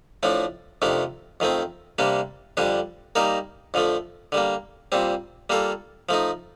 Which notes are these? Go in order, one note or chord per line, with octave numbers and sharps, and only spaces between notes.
A2 F3 A3 D4
F2 C3 D#3 A3 D4
F2 D#3 A3 C4
C3 G3 A#3 D4
F2 D3 G3 D4
G3 A#3 D#4 A#4
F2 D3 F3 A3
D3 G3 A#3
A#2 G3 C4
G3 A#3 F4 A4
F3 A3 D#4